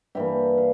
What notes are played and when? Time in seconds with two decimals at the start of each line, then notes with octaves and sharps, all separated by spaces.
0.15 G2 E3 G3 A#3 E5 G5
0.58 F5